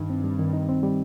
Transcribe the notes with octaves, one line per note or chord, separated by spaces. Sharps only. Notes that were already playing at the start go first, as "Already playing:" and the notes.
Already playing: G2 D#3 D#4
C4
G3
D#3
D#4
C4
G3